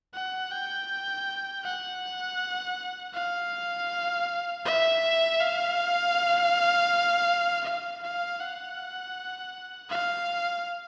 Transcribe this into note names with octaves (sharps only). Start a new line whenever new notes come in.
F#5
G5
F#5
F5
E5
F5
F5
F5
F#5
F5